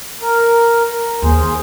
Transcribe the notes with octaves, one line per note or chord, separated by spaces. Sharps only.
A#4
D#2 G#4 C5